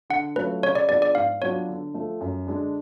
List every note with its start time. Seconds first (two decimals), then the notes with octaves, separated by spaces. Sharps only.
0.10 D3 F#5
0.36 F#3 A3 C#4 F4 B4
0.63 C#3 C#5
0.75 D5
0.89 F3 B3 D4 G#4 D5
1.02 D5
1.15 G#2 F5
1.42 F#3 B3 D4 F4 C#5
1.68 D3
1.94 F3 A3
2.21 F#2
2.47 D3 G#3 D4